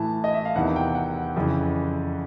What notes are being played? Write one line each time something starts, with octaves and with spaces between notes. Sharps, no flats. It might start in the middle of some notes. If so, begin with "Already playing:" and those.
Already playing: A2 E3 A5
D#5
E5
F5
E2 C3 D#3 F#5
G5
F#5
F2 C#3 E3